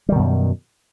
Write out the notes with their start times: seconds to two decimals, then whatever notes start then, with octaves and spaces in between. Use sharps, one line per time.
0.09 G3
0.12 D#3
0.15 B2
0.19 F#2